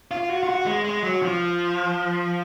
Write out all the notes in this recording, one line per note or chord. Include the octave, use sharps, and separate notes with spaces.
F4
F#4
F4
F#4
G#3
G#3
F#3
F3